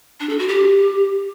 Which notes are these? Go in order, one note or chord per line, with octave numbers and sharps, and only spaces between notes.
D4
A4
F#4
G4